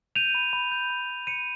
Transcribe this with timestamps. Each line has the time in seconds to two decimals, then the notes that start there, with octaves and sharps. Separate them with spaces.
0.16 G6 D#7 F7
0.35 B5
0.53 B5
0.72 G6
0.90 B5
1.10 G6
1.27 B5 C#7 D#7